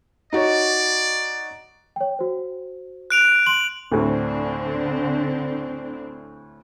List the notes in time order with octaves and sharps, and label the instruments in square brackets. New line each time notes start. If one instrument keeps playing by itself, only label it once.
[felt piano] D#4 F#4 C#5 [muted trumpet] D5
[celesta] C#5 G5
F#4 C5
[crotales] F#6 D7 F7
[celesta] C6 [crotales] F#7
[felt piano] D2 A2 [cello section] D3 C4 D4